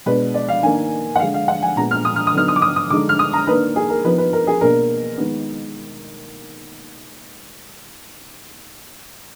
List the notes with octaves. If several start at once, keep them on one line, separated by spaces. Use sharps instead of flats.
B2 G#3 D4 B4
D5
F5
D#3 A#3 D4 G#5
F#5
D3 G#3 D4 F5
F5
F#5
G#5
A#2 G#3 B3 A#5
F6
D#6
F6
D#6
D3 F#3 B3 D#4 F6
D#6
D6
D#6
D#6
D3 G#3 D#4 D6
F6
D#6
A#5
D#3 A#3 D4 B4
G#4
A#4
F3 B3 D#4 B4
B4
A#4
G#4
B2 A#3 D4 A#4
D#3 G#3 B3